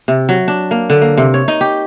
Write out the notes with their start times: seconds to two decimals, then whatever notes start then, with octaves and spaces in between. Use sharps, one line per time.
0.08 C3
0.29 F#3
0.48 D4
0.71 A#3
0.90 D3
1.02 A#3
1.18 C3
1.34 C#5
1.48 D#4
1.61 G4